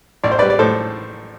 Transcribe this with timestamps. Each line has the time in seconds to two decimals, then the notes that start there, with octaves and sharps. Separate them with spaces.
0.24 A1 D5
0.32 C5
0.39 G3 B4 D5
0.50 D5
0.59 A2 A4 C5